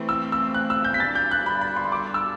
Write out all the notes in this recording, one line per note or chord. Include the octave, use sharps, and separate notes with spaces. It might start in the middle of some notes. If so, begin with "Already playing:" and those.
Already playing: E3 A3 C4
E6
E6
F#6
E6
G6
B6
G3 D4 A4 A6
G6
F#6
B5
B5
C6
D6
E6